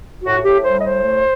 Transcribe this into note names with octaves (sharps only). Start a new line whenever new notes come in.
A2 F#4
A2 G4
G3 C5
D#5
A2 C5
A3